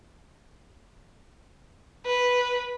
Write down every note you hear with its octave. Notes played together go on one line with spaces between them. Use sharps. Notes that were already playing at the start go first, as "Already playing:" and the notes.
B4